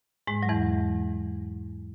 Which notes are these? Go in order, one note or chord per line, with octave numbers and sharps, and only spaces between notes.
G#2 G#3
F#3
E2 E3